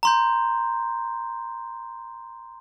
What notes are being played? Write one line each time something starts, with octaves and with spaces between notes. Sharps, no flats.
A#5 C6 G6